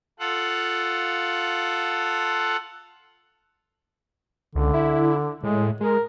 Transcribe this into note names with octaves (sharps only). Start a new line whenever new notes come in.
F4 A4 F#5
C#2 D3
E4
A2 G#3
G#3 A#4